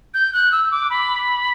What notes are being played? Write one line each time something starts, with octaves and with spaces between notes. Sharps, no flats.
G6
F#6
E6
D6
B5